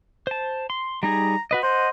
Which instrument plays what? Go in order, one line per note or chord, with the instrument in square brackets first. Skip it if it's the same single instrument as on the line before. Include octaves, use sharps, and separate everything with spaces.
[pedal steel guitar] C5 A5
C6
[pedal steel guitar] G3 D#4 G#4 [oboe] A#5
[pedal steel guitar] F#4 B4 D#5
[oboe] C5 [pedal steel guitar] D#5 F#5